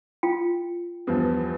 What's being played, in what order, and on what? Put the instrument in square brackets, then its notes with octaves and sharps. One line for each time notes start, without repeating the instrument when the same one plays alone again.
[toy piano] F4 G5
[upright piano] E2 G2 F3